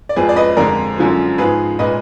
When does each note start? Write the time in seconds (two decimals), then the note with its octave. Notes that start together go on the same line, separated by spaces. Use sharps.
0.09 D5
0.16 F2 F3 G#3 G#4 B4
0.29 D5
0.36 B4 D#5
0.57 F2 D3 G#3 A#4 D5
0.98 F#2 D3 F3 G#3
1.38 G#2 F3 G#3 G#4 B4
1.79 A#2 G#3 B4 D#5